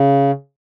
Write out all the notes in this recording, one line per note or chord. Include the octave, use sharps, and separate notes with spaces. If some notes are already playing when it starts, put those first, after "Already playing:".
Already playing: C#3